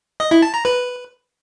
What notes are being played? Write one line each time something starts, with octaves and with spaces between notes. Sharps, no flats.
D#5
E4
A5
A#5
B4